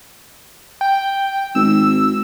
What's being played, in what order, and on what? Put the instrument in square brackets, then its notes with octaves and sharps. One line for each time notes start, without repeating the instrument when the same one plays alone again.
[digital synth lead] G5
[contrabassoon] G#1 [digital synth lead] E6